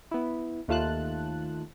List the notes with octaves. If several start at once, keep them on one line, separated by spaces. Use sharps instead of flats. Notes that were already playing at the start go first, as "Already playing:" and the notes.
B3 E4
D#2 A3 F4 A5 F#6